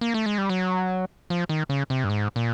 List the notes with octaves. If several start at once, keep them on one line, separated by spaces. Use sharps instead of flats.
A#3
A3
G#3
G3
F#3
F3
D#3
C#3
C3
G2
G#2
A#2